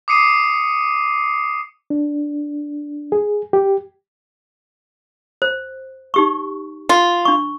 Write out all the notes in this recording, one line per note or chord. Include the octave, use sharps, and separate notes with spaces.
D6 D#6 C7 C#7 D#7
D4
G#4
G4
C5
D#4 G4 C#6
F4
D4 C#6